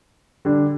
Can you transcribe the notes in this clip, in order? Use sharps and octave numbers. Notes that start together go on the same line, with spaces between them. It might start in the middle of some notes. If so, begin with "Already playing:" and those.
D3 G3 D4